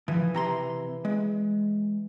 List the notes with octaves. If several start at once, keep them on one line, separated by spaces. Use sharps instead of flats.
E3 F3
C3 A#5 C6
G#3